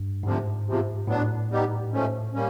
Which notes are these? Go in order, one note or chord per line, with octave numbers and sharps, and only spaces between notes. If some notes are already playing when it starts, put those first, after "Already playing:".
Already playing: G2
D2 G#2 C3 F3
E2 C3 F3
A2 F#3 B3 D4
G3 B3 D#4 G4
G#2 F3 A3 C#4
G3 A#3 C#4